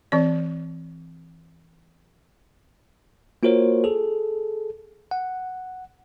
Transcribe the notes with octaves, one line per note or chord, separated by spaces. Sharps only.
E3 C4 D5
A#3 F4 F#4 A#4 C5 C#5
G#4 A4
F#5